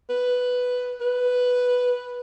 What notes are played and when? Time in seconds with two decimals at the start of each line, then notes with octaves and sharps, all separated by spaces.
0.10 B4
1.01 B4